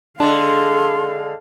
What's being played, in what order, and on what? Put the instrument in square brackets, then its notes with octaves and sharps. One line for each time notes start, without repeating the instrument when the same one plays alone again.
[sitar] D3 G#3 [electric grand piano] D4 A5 [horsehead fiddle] A4 F5 [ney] C6